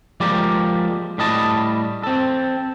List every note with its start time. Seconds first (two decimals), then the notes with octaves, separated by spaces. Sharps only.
0.20 F3 G#3 A#3 G4 D5
1.18 A2 G3 D#5 A5
2.03 C4 A4